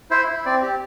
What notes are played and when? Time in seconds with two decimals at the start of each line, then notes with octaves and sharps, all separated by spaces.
0.11 E4 C5
0.28 E4
0.45 C4 D5
0.62 G4